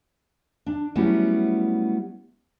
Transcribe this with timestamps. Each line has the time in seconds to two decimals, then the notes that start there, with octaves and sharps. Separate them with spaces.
0.66 D4
0.95 F#3 G3 A3 B3 C#4 E4